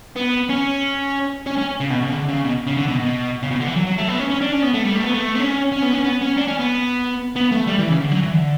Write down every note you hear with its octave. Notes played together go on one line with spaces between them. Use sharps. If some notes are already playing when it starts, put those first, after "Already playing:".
B3
C#4
C#4
C#4
C#3
B2
C#3
D3
C#3
B2
C#3
D3
B2
B2
C#3
B2
D3
E3
F#3
F#3
A3
B3
C#4
C#4
D4
C#4
B3
A3
G3
A3
B3
A3
B3
C#4
C#4
B3
C#4
B3
C#4
D4
C#4
B3
B3
A3
G3
E3
C#3
D3
F#3
E3
D3